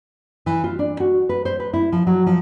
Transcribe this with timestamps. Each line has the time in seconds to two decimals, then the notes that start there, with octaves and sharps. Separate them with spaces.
0.46 E3
0.64 F4
0.79 D4
1.00 F#4
1.29 B4
1.45 C5
1.60 B4
1.73 E4
1.92 F3
2.07 F#3
2.26 F3